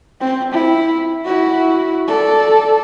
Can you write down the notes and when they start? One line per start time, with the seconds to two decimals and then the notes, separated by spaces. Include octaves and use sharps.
0.21 C4
0.52 E4
1.25 E4 F#4
2.08 A4 D5